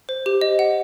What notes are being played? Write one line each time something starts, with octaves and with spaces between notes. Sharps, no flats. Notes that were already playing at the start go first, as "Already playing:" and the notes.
C5
G4
D#5
F#5